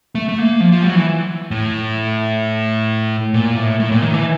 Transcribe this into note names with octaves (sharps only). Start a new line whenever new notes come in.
A3
A3
A#3
F3
F3
F#3
E3
A2
A#2
A2
A2
A#2
D#3
E3